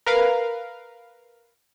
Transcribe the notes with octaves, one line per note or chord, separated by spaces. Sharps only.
A#4 B4 F5